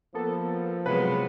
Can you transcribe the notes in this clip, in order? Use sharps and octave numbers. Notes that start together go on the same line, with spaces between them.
F3 A#3 B3 A4
C3 F#3 G#3 B3 B4 B5